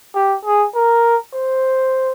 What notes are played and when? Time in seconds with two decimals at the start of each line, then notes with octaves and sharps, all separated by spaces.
0.15 G4
0.45 G#4
0.75 A#4
1.33 C5